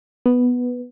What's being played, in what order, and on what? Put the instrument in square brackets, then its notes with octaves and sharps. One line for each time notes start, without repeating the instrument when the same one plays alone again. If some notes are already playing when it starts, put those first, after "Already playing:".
[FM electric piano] B3